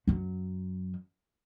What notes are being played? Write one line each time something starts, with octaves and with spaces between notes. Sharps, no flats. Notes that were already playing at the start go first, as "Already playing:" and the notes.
F#2 F#3